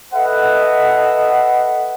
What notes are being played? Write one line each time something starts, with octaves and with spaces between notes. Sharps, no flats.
A4 B4 D#5 E5 F#5